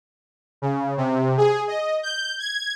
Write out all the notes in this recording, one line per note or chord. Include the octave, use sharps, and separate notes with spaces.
C#3
C3
G#4
D#5
G6
G#6